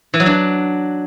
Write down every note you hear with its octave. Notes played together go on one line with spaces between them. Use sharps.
E3
F#3
D4